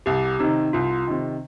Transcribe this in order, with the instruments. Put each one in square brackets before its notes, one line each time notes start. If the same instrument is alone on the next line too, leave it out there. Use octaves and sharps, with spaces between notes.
[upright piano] C2 [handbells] G4
[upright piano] C3 D#3 [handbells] D#4
[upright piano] C2 [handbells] F4
[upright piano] C3 D#3